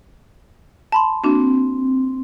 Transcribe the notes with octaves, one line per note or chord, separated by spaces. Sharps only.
A5 B5 C6
A#3 C4 D4 F#4